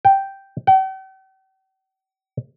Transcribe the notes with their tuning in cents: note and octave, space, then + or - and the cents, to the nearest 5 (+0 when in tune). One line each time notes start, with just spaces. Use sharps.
G5 -5
G5 -45